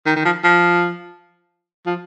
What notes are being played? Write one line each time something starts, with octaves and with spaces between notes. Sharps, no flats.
D#3
D#3
F3
F3
F3